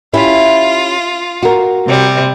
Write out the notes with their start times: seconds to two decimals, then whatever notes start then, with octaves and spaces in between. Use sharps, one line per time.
0.13 C#4 E4 F4 G4
1.43 F#4 A#4
1.86 C3 G3